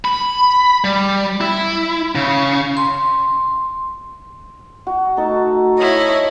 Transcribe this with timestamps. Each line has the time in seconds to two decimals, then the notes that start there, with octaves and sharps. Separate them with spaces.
0.05 B5
0.84 G3
1.41 E4
2.15 C#3
2.77 C6
4.87 F#4
5.17 A3 D#4 F#4 A4 A5
5.78 E4 C#5 D#5